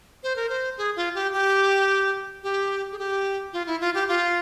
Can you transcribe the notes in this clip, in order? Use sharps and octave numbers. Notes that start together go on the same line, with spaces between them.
C5
A#4
C5
G#4
F4
G4
G4
G4
G#4
G4
F4
E4
F4
G4
F4